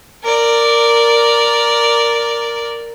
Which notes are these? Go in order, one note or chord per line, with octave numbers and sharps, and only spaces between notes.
A#4 D5